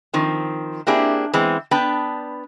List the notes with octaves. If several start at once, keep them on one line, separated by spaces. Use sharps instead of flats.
D#3 F3 C4
A#3 C4 D4 E4 G4 G#4
E3 G#3 B3 C4
B3 D4 B4 G5 A5